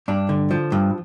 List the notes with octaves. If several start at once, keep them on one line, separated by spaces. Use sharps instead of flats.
G2 D4
D3
F3
G2